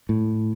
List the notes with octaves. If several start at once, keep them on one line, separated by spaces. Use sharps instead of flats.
A2